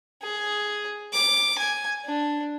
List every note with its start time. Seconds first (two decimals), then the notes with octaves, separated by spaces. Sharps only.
0.23 G#4
1.13 D6
1.58 G#5
2.05 D4